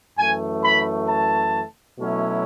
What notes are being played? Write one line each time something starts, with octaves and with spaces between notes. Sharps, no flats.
F#2 E3 A3 G#5
B5
A5
B2 F#3 A3 C#4 E4